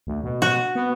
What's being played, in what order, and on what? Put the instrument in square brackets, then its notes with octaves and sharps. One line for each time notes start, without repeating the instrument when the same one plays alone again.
[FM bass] D2
B2
[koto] F#4
[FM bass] B3